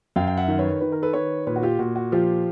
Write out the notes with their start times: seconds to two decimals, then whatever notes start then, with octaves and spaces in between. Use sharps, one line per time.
0.16 F#2 F5 G5
0.27 G5
0.37 E5 F#5
0.48 D#3
0.59 B4 C#5
0.81 D#3 B4
0.92 A#4
1.02 A4 B4
1.13 D#3 B4 C#5
1.47 A#2 B4 C#5
1.56 F#4
1.63 F4 G4
1.79 A#2 F#4
1.96 F#4
2.12 F3 F4 G4